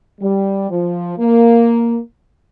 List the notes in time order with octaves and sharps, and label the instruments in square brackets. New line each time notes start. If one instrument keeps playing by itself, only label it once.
[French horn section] G3
F3
A#3